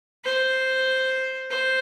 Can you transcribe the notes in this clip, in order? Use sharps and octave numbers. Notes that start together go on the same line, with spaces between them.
C5
C5